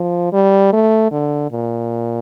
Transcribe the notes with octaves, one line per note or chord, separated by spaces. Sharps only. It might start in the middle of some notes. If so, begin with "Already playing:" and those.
Already playing: F3
G3
A3
D3
A#2